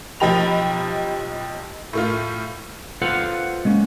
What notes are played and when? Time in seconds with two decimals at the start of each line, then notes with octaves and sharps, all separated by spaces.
0.20 B1 F3 D#4 G4 B5 F7
1.93 A2 A3 F4
3.02 F4 A4 B4 C5 F5 F#5
3.65 G#3 A#3 C#4